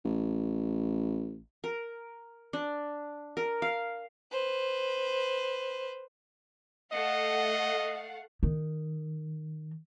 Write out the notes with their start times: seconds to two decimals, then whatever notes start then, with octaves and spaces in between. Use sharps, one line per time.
0.05 A1
1.64 A#4
2.53 D4
3.37 A#4
3.62 F5
4.31 B4 C5
6.92 A3 D#5 F5 F#5
8.43 D#3